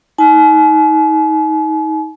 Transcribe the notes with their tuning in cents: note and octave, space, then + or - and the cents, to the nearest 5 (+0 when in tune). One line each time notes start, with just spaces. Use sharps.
D#4 +30 G#5 +45